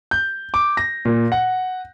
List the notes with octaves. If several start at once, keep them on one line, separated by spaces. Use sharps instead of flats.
G6
D6
A#6
A#2
F#5